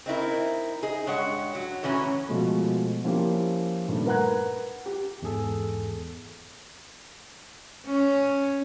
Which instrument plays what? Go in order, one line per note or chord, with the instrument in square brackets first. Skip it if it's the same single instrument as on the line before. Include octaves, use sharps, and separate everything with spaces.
[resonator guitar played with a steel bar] C4 D#4 E4 A#4
D#4 G#4
G2 G#3 C#5 F#5
F#3 F#5
A2 E3 F#3 C#4 A#5
[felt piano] B2 F3 G#3 A3
F3 A#3 C#4 E4 F4 G4
G2 A#2 D#3 A3
A#4 B4 F#5 A#5 F#6 G#6
G4
[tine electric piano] E2 G#2 G#4 A4
[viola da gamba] C#4